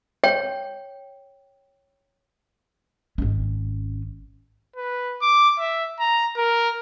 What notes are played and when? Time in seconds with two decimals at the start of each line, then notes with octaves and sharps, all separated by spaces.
0.24 C#5 G5
3.18 G#1 C#4
4.76 B4
5.21 D6
5.59 E5
5.99 A#5
6.37 A#4